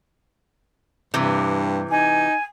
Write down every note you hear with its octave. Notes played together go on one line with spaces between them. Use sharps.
G2 C3 E3
D#4 G#5